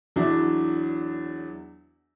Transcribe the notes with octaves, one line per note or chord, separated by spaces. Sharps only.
E2 F#3 D4 E4